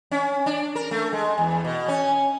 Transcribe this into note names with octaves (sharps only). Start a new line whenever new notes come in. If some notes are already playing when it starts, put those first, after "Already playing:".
C#4
D4
A#4
A3
G#3
E2
B2
C#4